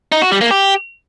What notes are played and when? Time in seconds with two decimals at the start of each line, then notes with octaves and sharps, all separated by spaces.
0.12 D#4
0.22 F#4
0.31 G3
0.41 A#3
0.51 G4